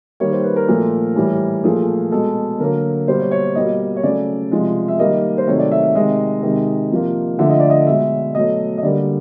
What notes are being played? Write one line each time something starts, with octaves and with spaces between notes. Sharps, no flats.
D#3 G3 A#3 C#5
C5
B4
A#4
A#2 F3 A3
A2 E3 G3
A#2 F3 A3 G#4
B2 G#3 A4
D3 F#3 A#3 A#4
B2 G3 A#3 C5
C#5
C#5
B2 G3 A#3 D#5
C#5
C#3 F#3 A3 D5
C3 F3 G#3
E5
D#3 G3 A#3 D#5
C5
C3 D#3 F#3 A3 C#5
D5
E5
E5
C3 D#3 G#3 D#5
C3 D#3 G#3
C3 F3 A#3
D3 F3 A3 E5
D#5
D5
D#5
B2 G#3 E5
B2 F#3 A3 D#5
D#5
D3 G3 A#3 D5